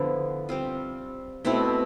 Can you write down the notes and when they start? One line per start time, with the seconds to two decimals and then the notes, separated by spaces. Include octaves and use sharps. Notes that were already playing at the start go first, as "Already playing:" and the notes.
Already playing: D3 F3 B3 E4
0.49 G3 C4 F4
1.45 B2 A3 C4 E4